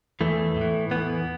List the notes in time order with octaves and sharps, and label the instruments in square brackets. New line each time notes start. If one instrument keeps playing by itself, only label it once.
[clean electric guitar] E2 E3 A3
A2 E3
E2 E3 B3